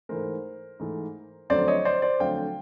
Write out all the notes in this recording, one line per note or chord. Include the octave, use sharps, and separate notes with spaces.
G#2 E3 A3 A#4 C5
G#2 E3 A3
F2 D3 F#3 A3 C5 D5
C#5 D#5
C5 D5
C5 D5
F2 D3 F#3 A3 F5 G5